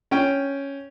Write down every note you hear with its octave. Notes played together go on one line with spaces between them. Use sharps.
C#4 G5